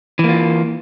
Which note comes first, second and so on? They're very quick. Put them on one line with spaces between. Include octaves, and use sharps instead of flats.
E3 A#3 F4